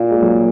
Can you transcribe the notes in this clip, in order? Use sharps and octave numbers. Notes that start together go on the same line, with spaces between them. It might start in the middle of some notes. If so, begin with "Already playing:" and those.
Already playing: A#2 A#3
G#3
F#3